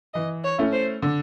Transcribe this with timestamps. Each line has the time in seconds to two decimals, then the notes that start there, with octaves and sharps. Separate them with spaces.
0.14 E3 D#5
0.44 C#5
0.58 A3 C#4 E4
0.72 C5
1.02 D3